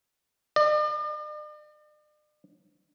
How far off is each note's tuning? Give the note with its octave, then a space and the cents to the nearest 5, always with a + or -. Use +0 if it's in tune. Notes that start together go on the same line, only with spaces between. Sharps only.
D5 +45